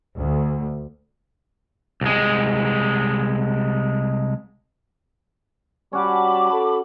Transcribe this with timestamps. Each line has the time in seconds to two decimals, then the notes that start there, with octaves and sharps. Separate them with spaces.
0.18 D2
2.01 C2 G#3
5.93 G3 C#4 F#4 A5 B5 D6
6.53 A4